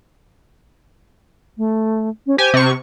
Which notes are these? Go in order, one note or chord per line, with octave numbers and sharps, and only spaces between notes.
A3
C#4
G4 C5 G#5
C3 C#6